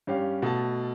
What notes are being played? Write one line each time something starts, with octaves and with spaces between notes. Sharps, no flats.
G2 C#4 G4 F5
B2 A3 A5